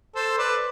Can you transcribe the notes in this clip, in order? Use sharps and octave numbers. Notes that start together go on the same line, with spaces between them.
A4 C5
B4 D5